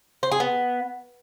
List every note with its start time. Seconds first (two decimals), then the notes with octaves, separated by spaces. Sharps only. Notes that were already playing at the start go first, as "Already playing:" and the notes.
0.23 C5
0.31 G#4
0.40 B3